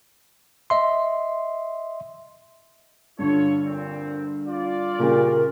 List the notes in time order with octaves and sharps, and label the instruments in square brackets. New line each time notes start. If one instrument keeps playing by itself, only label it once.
[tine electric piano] D#5 E5 C6
[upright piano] G2 D3 [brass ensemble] F4 A4 C#5
[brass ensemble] A#2 C4
F4 D5
[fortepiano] A#2 C#3 G4 [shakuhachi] A#4